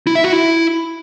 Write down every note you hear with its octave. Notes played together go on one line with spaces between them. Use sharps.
E4
E5
F#4
E4